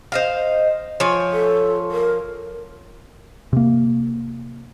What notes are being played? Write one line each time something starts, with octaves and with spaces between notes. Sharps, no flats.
C5 D#5 F5
F3 C#5 G#5
A4
A#4
C3 A#3